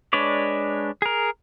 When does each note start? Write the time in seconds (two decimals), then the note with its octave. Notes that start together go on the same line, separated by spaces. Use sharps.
0.13 G#3 D4 B4 C#5 D5
1.02 G#4 A#4